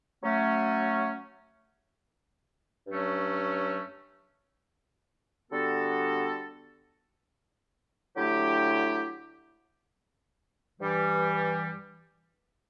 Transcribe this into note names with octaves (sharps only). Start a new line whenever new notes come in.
F#3 A3 C#4
G2 F#3 A3 C#4
D3 G3 B3 F#4 A4
D3 F#3 A3 E4 G4
G2 E3 G3